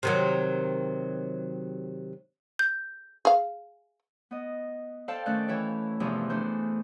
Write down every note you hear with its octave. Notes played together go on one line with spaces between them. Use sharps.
C3 D#3 F#3
G6
G#4 F5
B3 D#5
A4 C5 D5 F5 G5 A5
D#3 A3 C#4 D5 G5 F#6
E3 E4 C#5
E2 G2 C3 E3 F3
E3 A3 D4 C5